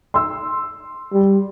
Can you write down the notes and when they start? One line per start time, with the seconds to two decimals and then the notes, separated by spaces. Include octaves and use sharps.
0.14 C6 E6
1.13 G3